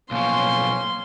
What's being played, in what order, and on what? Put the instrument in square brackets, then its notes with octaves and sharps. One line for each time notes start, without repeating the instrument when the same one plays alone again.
[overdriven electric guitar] B1 F3 [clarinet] A#3 [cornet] C#4 [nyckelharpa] C6